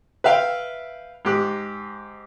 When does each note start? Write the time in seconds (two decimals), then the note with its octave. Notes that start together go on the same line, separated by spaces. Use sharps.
0.24 B4 E5 F5 G5
1.25 G#2 G4 F#6